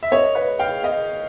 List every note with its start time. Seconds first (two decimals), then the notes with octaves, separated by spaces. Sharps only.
0.03 E5
0.12 C#5 D#5
0.35 B4 C#5
0.59 F5 G5
0.83 D#5 F5